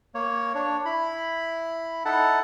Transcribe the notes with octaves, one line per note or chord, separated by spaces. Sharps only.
A#3 C#5
D4 C#5
E4 B5
D#4 E4 A4 F#5 A5